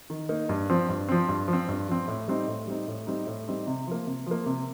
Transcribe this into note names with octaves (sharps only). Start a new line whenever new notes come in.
D#3
A#3 D#4
G2
F3 C4
G2
F3 C4
G2
F3
C4
G2
F3 C4
A2
G3 C4 D#4
A2
G3 C4 D#4
A2
G3 C4 D#4
A2
G3 C4 D#4
C3
F3 A#3
C3
F3 A#3
C3